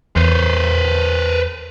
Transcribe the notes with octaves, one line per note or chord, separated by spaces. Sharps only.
E2 B4 C5